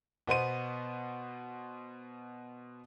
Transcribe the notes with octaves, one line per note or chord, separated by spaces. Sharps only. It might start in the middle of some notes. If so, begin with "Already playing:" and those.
B2 B3 C5 D#7